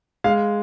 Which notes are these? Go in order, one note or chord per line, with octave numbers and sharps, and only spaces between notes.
G#3 F5